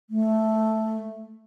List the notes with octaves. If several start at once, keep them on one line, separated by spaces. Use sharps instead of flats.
A3